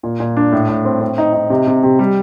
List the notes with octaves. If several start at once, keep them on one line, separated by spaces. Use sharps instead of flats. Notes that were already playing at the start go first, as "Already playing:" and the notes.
A#2
A#2
D4
A2
A2
C4
C4
D#4
D#4
C3
C3
C3
G3